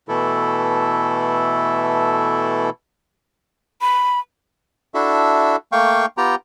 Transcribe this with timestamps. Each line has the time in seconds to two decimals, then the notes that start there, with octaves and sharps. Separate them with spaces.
0.09 B2 E3 A3 E4 A4
3.81 B5
4.94 D4 E4 F#4 A4 E5
5.72 A3 A#3 F5 G5 C#6
6.17 B3 F4 G4 G5 A#5